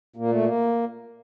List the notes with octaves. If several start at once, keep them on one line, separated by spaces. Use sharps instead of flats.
A#2 A#3
A3
A#3